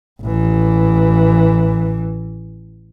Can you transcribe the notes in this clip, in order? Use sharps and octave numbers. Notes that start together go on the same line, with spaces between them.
A1 E3